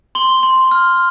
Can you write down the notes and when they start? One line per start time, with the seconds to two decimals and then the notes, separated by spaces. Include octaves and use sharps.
0.15 C6 G7
0.43 C6
0.71 F6